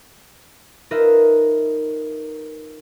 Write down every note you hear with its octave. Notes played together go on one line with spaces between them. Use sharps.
D#4 F4 A#4 B4 D#5 E5